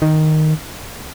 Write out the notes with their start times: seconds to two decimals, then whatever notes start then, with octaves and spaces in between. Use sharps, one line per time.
0.02 D#3